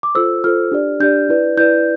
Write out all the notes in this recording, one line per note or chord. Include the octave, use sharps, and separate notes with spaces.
D6
F4 A4 C5 E6
F4 A4 C5 F6
D4 G4 D5
D4 G4 D5 G6
E4 B4 D5
E4 B4 D5 G6